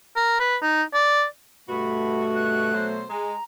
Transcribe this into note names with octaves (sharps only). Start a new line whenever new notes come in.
A#4
B4
D#4
D5
G2 B2 A3 F#4 B5
F#6
B2 F#3 C5
G#3 A#5